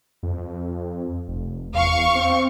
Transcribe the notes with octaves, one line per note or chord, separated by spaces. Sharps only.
F2
F1
E2 F5 C#6
C4